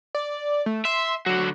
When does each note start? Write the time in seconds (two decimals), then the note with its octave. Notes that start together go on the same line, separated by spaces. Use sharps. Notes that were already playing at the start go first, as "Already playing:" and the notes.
0.15 D5
0.66 A3
0.85 E5 C6
1.26 D3 F#3 F#4